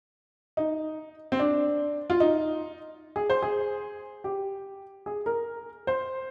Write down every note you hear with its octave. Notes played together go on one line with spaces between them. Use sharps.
D#4
C4
D4
F4
D#4
G#4
C5
G#4
G4
G#4
A#4
C5